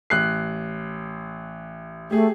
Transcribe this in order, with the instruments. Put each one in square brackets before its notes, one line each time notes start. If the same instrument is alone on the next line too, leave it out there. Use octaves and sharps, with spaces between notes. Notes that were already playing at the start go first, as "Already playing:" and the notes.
[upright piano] A1 F#6 C7
[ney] A3 [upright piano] G4 G#4